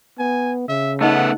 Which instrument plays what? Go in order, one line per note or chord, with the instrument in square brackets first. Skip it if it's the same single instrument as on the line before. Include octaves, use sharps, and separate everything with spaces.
[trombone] B3 [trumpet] G#5
[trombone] C#3 [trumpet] E5
[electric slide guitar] A3 B3 [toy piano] D#4 D#5 A5 [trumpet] F#5